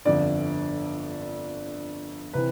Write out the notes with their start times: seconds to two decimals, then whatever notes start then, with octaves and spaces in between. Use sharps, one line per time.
0.05 G1 F2 D3 D5
2.33 C3 E3 B4